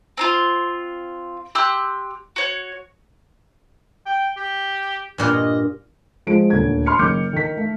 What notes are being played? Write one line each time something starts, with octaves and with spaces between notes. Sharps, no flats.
C4 D4 F4
G4 C6 E6 F#6
F#4 C#5
G5
G4
G2 A#2 F4
D#5
F3 G#3 D7
D#1 D2 G#6
C6 F6 C#7
F#1 D#3 D6 F6 G6 C#7
D#3 B6
A3